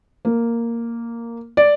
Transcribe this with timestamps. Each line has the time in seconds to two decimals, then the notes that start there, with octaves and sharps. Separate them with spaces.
0.25 A#3
1.57 D5